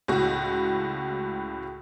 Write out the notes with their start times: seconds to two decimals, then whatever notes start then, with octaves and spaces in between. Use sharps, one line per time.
0.08 C#2 A2 F#4